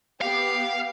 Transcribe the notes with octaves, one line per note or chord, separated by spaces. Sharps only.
B3 G4 F5